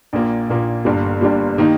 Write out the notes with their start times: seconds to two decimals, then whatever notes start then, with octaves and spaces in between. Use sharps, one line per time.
0.13 A#1 A#2 A#3
0.49 A#1 A#2 A#3
0.85 G1 G2 G3 A#3
1.21 G1 G2 G3 A#3
1.58 D#3 A#3 D#4 G4